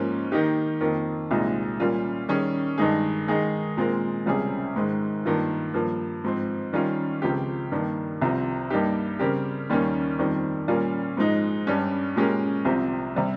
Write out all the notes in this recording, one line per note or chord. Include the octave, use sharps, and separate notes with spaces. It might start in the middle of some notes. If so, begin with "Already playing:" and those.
Already playing: G#2 F3 A#3 C#4
D#3 A#3 D#4 G4
F2 D#3 A#3
C2 A#2 G#3 D#4
A#2 G3 C#4 F4 A#4
D#3 G3 C#4 G#4
G2 D#3 G#3 D#4 G#4
D#3 G#3 D#4 G#4
A#2 G#3 C4 F4 A#4
C#2 C3 G3 C#4 G#4
G#2 D#3 G#3
G2 D#3 A#3 F4
G2 F3 A#3
G#2 F3 C4
D#3 G3 C#4 F4 A#4
C#2 C#3 F3 C4 G4
G2 D#3 G3 A#3
C2 C3 F3 C4
G2 G3 A#3 D#4 G4
C#3 G3 C4 G4 A#4
D#2 D#3 G3 A#3 C#4
F2 D#3 G3 C4
A#2 G3 C#4 F4 A#4
G#2 F3 G#3 D#4
G2 G3 C#4 G4
A#2 G#3 C#4 G4 A#4
C2 C3 F3 C4 G4
C3 G3 C4